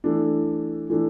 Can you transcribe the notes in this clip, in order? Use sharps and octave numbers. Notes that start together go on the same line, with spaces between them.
E3 A3 D4
E3 A3 D4